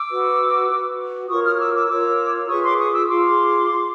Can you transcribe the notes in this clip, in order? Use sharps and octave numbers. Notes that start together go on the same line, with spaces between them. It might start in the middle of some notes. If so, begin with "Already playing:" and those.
Already playing: D6 E6
F#4 B4
F#4 B4
F4 A#4 C#5 C#6 D#6
D#6 F6
F6
D6 E6
D6 E6
F4 A#4 C#5 D6 E6
F4 G#4 B4 C#6 D#6
C6 D6
C#6 D#6
D6 E6
F4 G#4 C6 D6